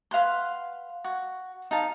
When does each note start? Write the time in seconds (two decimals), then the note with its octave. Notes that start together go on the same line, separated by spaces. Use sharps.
0.11 B4 F5 F#5 C6
1.04 F#4
1.71 D#4 F5 A5